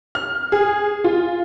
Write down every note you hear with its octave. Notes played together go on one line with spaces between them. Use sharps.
F6
G#4
F4